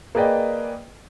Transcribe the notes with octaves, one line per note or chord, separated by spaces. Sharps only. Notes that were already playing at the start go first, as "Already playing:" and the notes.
A#3 G#4 B4 D5 D#5 G5